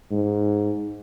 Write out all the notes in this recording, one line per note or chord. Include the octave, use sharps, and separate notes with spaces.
G#2